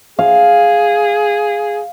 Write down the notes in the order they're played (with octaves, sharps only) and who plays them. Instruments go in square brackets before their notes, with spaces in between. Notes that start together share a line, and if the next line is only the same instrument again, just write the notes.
[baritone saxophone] G#4 [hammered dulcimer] F5